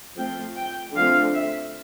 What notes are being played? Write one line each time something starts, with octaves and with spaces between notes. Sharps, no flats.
F3 A3 C4 G5
G5
D3 F3 A3 C4 F5
E5